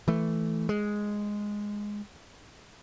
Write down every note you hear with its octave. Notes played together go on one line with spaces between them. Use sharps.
E3 A3
G#3